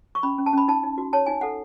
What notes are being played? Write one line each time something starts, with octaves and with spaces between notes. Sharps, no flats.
C#6
C#4 B5
C#4
A5
C#4 B5
D#4 A5
D#4
F#4
C#5 A5
D#4 G#5
A4 F#5